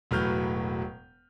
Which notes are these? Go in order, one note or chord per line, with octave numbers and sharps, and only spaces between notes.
E1 A2 F#3 B4 F6 G6